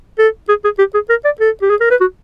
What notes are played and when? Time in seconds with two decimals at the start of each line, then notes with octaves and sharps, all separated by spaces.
0.18 A4
0.48 G#4
0.64 G#4
0.79 G4
0.94 G#4
1.09 A#4
1.25 D5
1.40 A4
1.62 G4
1.70 G#4
1.80 A#4
1.90 B4
2.00 F#4